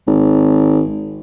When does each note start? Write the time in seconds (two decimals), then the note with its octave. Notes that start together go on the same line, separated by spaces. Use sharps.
0.07 G#1